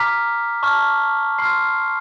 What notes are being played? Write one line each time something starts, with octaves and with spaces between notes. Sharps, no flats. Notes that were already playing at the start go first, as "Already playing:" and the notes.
Already playing: A#5 D6 F6 B6
A5 C#6 F6
C6 F6 C7